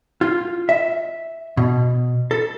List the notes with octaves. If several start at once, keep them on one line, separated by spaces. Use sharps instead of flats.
F4
E5
B2
A4